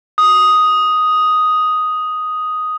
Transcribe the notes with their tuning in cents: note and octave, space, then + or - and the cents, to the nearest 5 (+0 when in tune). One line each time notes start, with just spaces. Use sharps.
D#6 +5